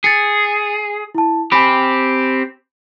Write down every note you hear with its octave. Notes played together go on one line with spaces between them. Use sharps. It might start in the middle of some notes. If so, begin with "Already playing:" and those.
G#4 A6 C#7
E4 A5
C4 G4 G#5 B5